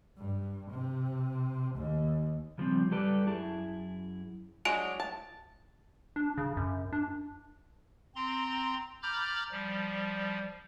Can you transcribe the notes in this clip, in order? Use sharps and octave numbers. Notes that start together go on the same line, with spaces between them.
G2
C3
D#2
C#3 F3 G3 C4
G3 G4 A4 B4 D5
F#2 E4 G#4 A5
F#3 G#3 D4 G#5 D7 F7
A5
D4
C#3
F#2
D4
C4 A#5 C6
A#5 B5 D6 F6 G6 A6
F3 G3